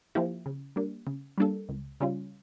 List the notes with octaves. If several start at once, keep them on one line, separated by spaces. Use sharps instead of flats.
F3 A#3 E4 G4
C#3
G3 A#3 D4
C#3
G3 A#3 D4 A4
C#2
C#3 G3 C#4 F4